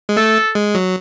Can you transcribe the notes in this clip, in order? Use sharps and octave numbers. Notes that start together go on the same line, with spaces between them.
G#3
A3 A4
G#3
F#3